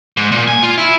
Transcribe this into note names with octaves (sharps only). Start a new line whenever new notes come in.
G#2
A#2
G#5
F4
E4